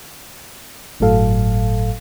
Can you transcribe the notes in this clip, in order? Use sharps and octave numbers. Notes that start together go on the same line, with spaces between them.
G1 A2 F#3 A4 F5